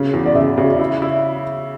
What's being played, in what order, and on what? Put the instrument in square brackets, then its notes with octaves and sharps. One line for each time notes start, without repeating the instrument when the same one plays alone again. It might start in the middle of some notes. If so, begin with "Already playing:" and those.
Already playing: [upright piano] C#3
E2
[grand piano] D5
[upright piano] C#3 [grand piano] E5
[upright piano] C#3
[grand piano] D5
[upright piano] E4 [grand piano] E5
[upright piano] E4